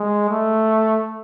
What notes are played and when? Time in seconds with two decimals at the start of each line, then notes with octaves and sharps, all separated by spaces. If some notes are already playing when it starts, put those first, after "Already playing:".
Already playing: G#3
0.30 A3